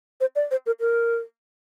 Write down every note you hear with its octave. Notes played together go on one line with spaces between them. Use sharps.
C5
D5
C5
A#4
A#4